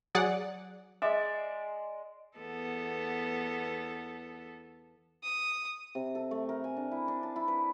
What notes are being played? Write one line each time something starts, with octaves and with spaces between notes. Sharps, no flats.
F#3 G#4 D5 F#5
G#3 D5 E5
E2 B3 A4
D#6
C3
A4
A3
A#4
G#5
D4
E4
D4
A5
E4
B4